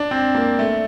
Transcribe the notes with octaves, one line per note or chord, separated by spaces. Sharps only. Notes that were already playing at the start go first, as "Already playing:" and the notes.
Already playing: D4
C4
A#3
A3